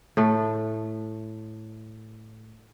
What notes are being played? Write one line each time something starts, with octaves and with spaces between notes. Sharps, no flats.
A2 A3